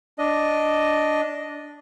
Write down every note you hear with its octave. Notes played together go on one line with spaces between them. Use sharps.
D4 D#5